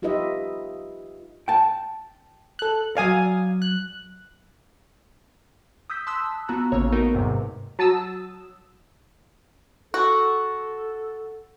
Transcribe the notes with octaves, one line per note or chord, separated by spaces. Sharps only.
D#4 F4 G4 B4 D#5 E5
G5 A5
A4 F#6
F#3 D5 F5 G#5 D#6
F#6
D#6 E6 G6 B6
A5 C6 D#6 E6 F#6 B6
B3 F4 F#4 A#5 E6 F#6
A1 C#3 A#3 C#5
A3 B3 D#4 F#4 A#4
E2 G#2 C3 F#3
F#3 A5 D#6 E6
F#4 A4